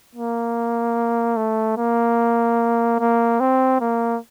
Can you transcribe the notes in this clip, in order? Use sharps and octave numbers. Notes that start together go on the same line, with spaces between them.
A#3
A3
A#3
A#3
C4
A#3